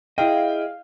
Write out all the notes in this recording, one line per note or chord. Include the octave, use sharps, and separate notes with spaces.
E4 G#4 D#5 F5 G5